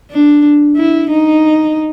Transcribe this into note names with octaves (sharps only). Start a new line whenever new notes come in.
D4
E4
D#4